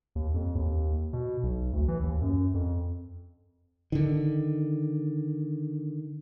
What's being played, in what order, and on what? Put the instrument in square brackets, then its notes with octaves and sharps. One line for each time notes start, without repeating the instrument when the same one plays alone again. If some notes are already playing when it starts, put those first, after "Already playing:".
[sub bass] D#2
F2
D#2
B2
B1
D2
E3
D#2
F#2
F2
[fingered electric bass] D3 D#3